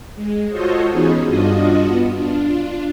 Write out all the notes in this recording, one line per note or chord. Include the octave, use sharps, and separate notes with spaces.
G#3
F4 F#4 A4 C5 C#5 D#5
E3 B3 C#4 D#4 G#4
G2 D4 F4 F#4 D#5
B3
D4 F4